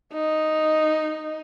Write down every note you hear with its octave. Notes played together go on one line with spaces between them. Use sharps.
D#4